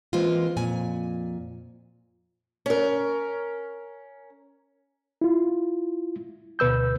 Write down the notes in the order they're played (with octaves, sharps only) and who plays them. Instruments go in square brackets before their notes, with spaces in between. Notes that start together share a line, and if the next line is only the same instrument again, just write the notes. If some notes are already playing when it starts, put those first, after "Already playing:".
[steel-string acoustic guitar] E3 G#3 A#3 C4 C#4 F4
F2 A#2 G#5
C#4 A#4
[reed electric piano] E4 F4
D2 B2 B4 E6 G6